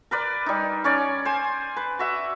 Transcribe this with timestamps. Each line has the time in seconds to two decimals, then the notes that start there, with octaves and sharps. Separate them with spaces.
0.11 A#4 B4 D5
0.46 G3 D#4
0.84 C#4 C#5 D5
1.25 C5 G#5
1.76 B4
1.99 F#4 E5 F#5